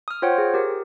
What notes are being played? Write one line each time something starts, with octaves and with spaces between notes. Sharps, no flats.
D#6 F6
F4 C5 C#5 F#5 G5
G#4
G4 A#4